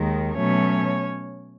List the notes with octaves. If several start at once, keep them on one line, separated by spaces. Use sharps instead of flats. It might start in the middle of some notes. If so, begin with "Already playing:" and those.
Already playing: D#2 D#3 G#3
B2 F#3 A3 C#4 C#5